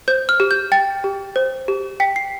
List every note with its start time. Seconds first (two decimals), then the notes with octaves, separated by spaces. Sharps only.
0.08 C5 G6
0.29 F6
0.40 G4
0.51 G6
0.72 G5 A6
1.04 G4
1.36 C5
1.68 G4
2.00 G5 B6
2.16 C7